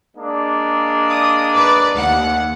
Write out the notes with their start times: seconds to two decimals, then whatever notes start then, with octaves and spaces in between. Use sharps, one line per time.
0.16 G#3 A#3 D4
1.10 D#6
1.53 B4 D5
1.93 D#2 F#5